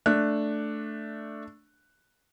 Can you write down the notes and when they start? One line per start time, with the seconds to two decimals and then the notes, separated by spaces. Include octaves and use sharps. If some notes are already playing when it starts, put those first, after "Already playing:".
0.06 A3 D4 F#6